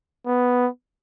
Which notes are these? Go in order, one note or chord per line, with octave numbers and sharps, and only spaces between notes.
B3